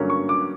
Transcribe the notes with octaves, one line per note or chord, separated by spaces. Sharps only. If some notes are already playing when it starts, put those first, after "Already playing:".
Already playing: G2 D3 F#3 A#3 C#4
C#6
D6